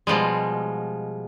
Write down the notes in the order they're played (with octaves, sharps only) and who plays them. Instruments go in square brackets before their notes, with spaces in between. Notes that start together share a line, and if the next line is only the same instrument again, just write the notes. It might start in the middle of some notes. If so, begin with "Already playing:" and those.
[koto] B2 F3 G3 G#3